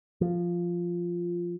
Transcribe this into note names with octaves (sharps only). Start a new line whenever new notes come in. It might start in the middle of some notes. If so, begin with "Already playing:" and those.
F3